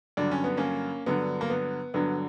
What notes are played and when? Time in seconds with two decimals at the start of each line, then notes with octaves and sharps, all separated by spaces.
0.17 G2 D3 F#3 D4
0.31 C#4
0.44 B3
0.57 A#3 C#4
1.06 G2 D3 F#3 B3
1.41 A#3
1.50 B3
1.94 G2 D3 F#3 B3